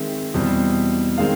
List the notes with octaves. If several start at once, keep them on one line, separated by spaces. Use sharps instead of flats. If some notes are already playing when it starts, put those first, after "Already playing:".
Already playing: D#3 G#3 C4 E5
E2 B2 G3 C4
D#3 G#3 C4 F5